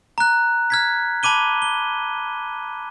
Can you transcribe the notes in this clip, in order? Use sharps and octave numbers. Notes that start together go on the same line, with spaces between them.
A#5 F#6
F6 G#6 B6
A5 B5 D6 D#7 G7
G7